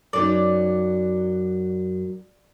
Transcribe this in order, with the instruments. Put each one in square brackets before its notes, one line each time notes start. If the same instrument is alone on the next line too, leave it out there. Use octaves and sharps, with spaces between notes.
[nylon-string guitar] F#2 F#3 D#4 [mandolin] D5